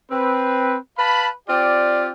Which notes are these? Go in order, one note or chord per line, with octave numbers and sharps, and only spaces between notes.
C4 B4
B4 F5 A5 B5
C4 F4 G4 D5